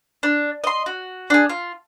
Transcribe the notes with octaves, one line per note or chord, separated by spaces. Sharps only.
D4
D#5 C6
F#4
D4 G#4
F4